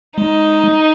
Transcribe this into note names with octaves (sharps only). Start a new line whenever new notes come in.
G#3 D#4